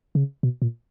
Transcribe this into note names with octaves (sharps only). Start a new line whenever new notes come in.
C#3
B2
A#2